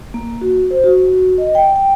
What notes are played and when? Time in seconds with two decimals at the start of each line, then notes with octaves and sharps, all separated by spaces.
0.14 A#3
0.41 F#4
0.71 C5
0.84 F#4
1.14 F#4
1.38 D#5
1.55 G5
1.76 G5